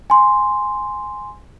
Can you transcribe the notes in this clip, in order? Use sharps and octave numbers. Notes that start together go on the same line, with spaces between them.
G#5 C6